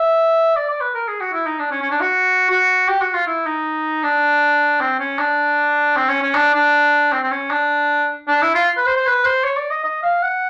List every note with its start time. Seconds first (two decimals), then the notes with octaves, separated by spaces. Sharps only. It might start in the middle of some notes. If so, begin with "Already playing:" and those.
Already playing: E5
0.56 D5
0.69 D5
0.81 B4
0.95 A#4
1.08 G#4
1.20 F#4
1.33 E4
1.46 D#4
1.59 D4
1.71 C#4
1.82 C#4
1.91 D4
2.01 F#4
2.49 F#4
2.89 G4
3.01 F#4
3.14 F4
3.27 E4
3.46 D#4
4.03 D4
4.81 C4
4.99 C#4
5.19 D4
5.97 C4
6.09 C#4
6.22 C#4
6.35 D4
6.54 D4
7.13 C4
7.23 C4
7.31 C#4
7.51 D4
8.28 D4
8.42 E4
8.55 F4
8.77 B4
8.86 C5
8.96 C5
9.06 B4
9.25 C5
9.44 C#5
9.57 D5
9.70 D#5
9.84 D#5
10.03 F5
10.22 F#5